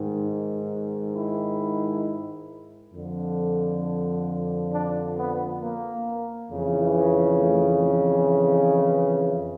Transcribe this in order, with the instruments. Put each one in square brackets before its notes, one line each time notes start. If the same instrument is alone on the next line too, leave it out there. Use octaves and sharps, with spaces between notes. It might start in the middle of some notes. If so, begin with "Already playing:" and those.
Already playing: [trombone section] G#2 D#3
E4
F2 D3 F3
D4
B3
A#3
F2 C#3 E3
A3